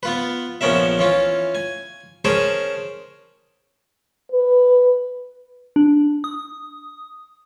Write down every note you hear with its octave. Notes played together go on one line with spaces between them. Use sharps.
B3 F4 B4
A#1 F3 B3 C#4 A#4 E5
E3 C#4 F4
G#5
C#4 G#4 A#4 C5 G#5 A5
B4
D4
D#6